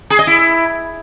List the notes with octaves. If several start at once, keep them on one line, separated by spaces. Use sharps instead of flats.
G#4
D#5
E4